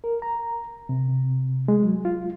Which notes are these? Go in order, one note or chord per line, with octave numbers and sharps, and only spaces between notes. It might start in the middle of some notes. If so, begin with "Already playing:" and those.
A#4
A#5
C3
G#3
F#3
F4